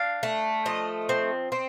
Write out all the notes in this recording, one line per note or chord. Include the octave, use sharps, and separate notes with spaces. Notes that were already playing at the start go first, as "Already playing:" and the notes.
Already playing: D4 F5
A3
F3 D#5
C4
C4